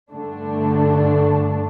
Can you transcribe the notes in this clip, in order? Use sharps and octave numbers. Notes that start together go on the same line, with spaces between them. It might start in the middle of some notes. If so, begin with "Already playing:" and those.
G2 D3 A3 D4